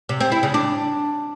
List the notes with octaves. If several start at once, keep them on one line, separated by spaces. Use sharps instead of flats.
C3
C4
E4
C#3
D4